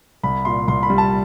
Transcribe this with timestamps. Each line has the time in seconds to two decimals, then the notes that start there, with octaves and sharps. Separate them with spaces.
0.23 C2 B5
0.45 A#2 C6
0.68 C2 C6
0.83 B5
0.90 G3
0.98 A5